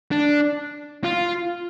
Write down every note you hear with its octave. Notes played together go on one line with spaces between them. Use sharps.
D4
F4